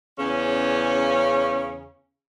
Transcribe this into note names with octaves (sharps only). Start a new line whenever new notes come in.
E2 C#3 C#4